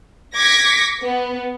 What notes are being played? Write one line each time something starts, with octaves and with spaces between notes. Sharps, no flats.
D6 G#6 A#6 B6 C#7
B3